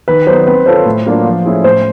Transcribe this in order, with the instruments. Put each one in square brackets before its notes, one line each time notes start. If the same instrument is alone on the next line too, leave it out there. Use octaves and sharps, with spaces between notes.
[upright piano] D#3 [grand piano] B4
[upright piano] F#3 B3 D#4 [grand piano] C5
[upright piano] C4 [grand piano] B4
[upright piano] F4 A4 C#5 [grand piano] C5
[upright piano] A2
F#3 A#3 D4 F4
F3
A3 C#4 E4 G#4
[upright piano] A2 [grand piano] C5